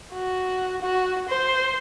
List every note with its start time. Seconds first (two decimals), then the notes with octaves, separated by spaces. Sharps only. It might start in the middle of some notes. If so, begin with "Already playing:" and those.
0.13 F#4
0.82 F#4
1.29 C5